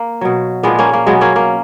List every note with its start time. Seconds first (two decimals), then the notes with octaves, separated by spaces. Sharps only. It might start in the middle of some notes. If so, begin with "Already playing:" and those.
Already playing: A#3
0.21 B2 F#3
0.63 A#2 F3 G#3 B3
0.79 A#3 C#4
0.93 A#3
1.07 B2 F#3 G#3 B3
1.21 A#3 C#4
1.36 A#3